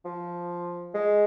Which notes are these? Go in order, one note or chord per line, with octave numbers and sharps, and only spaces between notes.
F3
G#3